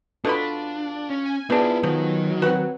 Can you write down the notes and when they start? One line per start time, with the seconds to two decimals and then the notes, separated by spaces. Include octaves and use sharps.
0.25 B2 D4 F4 A4 B5
1.10 C#4
1.26 G#5
1.50 B3 C4 D4 E4 F4 G#4
1.83 D#3 F3 F#3
2.42 C4 F#4 B4 F#5